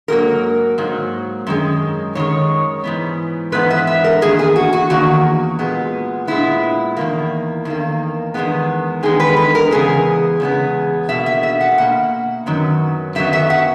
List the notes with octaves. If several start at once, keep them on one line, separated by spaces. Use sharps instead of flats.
G#2 F#3 A#3 A#4
G#2 F#3 A#3
F#2 D#3 G#3
F#2 D#3 G#3 C#5
G#2 E3 B3
G#2 E3 B3 B4
E5
E5
A#4
E2 D#3 A#3 G#4
G#4
F#4
F#4
E2 D#3 A#3 F#4
A#2 G#3 B3
A#2 G#3 B3 E4
E2 D#3 A#3
E2 D#3 A#3
E2 D#3 G#3 B3
E2 D#3 G#3 B3 G#4
B4
B4
A#4
E2 C#3 G#3 B3 G#4
E2 C#3 G#3 B3
B2 A#3 E5
E5
E5
F#5
B2 A#3 F#5
F#2 D#3 F#3 B3
F#2 D#3 F#3 B3 E5
E5
F#5